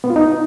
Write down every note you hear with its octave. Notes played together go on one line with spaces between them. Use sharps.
B3
F4
D#4